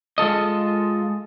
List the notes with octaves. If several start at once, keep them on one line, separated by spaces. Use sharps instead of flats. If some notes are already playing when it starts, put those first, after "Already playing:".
G#3 F4 A4 D#5